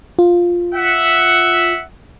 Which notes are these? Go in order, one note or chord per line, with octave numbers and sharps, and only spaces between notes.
F4
E5 F#5